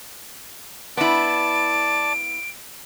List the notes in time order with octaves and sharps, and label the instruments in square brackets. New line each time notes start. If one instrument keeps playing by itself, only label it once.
[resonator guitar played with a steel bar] B3 E4 [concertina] D5 A5 [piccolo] D7